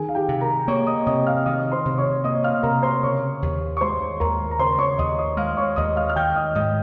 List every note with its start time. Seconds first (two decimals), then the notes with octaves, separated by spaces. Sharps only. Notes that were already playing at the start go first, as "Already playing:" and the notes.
Already playing: D#3 G#4 G#5
0.09 F5
0.15 G4 G5
0.29 C3
0.41 A#4 A#5
0.68 A#3 C#5 C#6
0.87 D#5 D#6
1.06 C3 D#5 D#6
1.27 F5 F6
1.46 D#3 D#5 D#6
1.71 C5 C6
1.86 C3
1.98 C#5 C#6
2.24 A#3 D#5 D#6
2.44 F5 F6
2.63 C3 A#4 A#5
2.82 C5 C6
3.03 C#3 C#5 C#6
3.42 D#2
3.77 C#6
3.81 G#3 C5 C6
4.20 D#2 A#4 A#5
4.51 A#5
4.59 C#3 C5 C6
4.78 C#5 C#6
4.98 D#2 D#5 D#6
5.18 D#5 D#6
5.37 G#3 F5 F6
5.57 C#5 C#6
5.76 D#2 D#5 D#6
5.96 F5 F6
6.09 F6
6.16 D#3 G5 G6
6.36 D#5 D#6
6.55 G#2 D#5 D#6